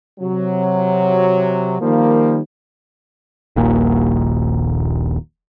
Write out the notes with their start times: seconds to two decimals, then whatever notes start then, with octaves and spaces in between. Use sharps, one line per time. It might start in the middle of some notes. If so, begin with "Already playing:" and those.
0.20 C3 F#3
1.80 D#3 F3 G3 A#3
3.56 D#1 A#1 D#2 A#2